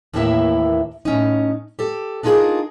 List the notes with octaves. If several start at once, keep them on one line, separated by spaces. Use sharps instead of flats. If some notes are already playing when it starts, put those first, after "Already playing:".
D#2 A2 E3 A#3 E4 E5
A2 C#4 D#4
G4 A4
D4 D#4 F4 F#4 G#4 A#4